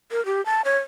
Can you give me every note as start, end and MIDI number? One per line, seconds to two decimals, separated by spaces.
0.11 0.24 70
0.26 0.44 67
0.46 0.62 81
0.65 0.78 73